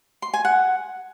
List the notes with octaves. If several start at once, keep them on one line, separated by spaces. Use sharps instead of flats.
C6
G#5
F#5